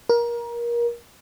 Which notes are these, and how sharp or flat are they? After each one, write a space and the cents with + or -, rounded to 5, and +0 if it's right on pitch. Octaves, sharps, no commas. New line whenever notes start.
A#4 +25